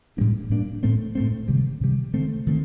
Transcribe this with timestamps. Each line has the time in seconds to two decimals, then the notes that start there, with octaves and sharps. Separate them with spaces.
0.17 A2 G3 A#3 D4
0.50 A2 G3 A#3 D4
0.83 A2 A3 C4
1.15 A2 A3 C4
1.48 C3 D#3 G3
1.81 C3 D#3 G3
2.13 D#3 A3 C4
2.47 D#3 A3 C4